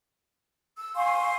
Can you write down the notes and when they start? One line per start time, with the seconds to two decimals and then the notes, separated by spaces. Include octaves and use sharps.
0.78 E6
0.96 F5 G#5 C6 C#6